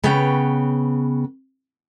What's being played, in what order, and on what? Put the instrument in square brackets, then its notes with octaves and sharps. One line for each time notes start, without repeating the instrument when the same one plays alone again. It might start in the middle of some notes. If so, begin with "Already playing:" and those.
[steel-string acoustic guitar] C#3 B3 B4 C#5 G5